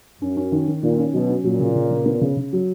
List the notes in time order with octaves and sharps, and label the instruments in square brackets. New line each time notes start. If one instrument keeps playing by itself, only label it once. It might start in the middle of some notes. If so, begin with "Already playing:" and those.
[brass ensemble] F#2 [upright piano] C#4
[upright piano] C#4
D#3
D#3
[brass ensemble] A#2 [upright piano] D#3
[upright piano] C#4
[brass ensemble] B2 [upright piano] F#3
[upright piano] C#4
[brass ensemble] A#2 [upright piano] F#3
[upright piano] C#3
C#3
C#3
B3
C#3
C#3
F#3